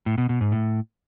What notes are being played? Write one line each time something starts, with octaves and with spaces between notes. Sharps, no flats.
A2
B2
B2
G#2
A2